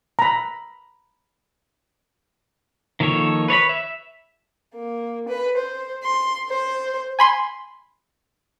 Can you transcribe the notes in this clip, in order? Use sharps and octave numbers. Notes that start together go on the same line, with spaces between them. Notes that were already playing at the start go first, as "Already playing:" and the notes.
A#5 B5
D#3 F3 A#3 A4 C#5
B4 C#5 D5 B5
E5
A#3
B4
C5
C6
C5
G#5 B5 C6